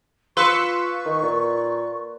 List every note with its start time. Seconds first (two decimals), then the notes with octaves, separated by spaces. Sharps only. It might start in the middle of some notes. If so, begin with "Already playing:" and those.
0.37 F4 B4 C6 C#6 E6 C#7
1.05 D#3
1.23 A#2